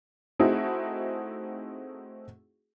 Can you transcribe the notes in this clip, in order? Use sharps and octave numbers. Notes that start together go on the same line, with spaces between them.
A3 C4 D#4 E4 F#4 G#4